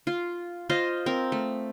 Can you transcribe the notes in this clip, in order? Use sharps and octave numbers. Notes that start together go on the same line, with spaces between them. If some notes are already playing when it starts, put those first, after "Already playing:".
F4
F4 C5 D#5
C4 A#4
A3